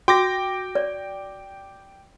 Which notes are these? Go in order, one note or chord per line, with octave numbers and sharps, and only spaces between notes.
F#4 G5 D6 A#6
D5